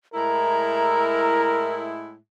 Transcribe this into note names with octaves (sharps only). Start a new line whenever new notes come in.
A2 G#3 E4 A#4 A#5